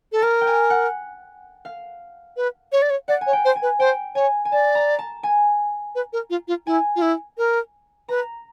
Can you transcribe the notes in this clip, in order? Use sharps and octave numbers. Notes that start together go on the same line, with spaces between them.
A4
A#4 A5
G5
G#5
F#5
F5
B4
C#5
D5
C#5
D5 F#5
G#5
C#5
G5
C5
G#5
B4
C5 G5
C#5 G#5
G#5
D5 A5
A#5
A5
G#5
B4
A#4
F4
F4
E4 G#5
F4
E4
A#4
B4 A#5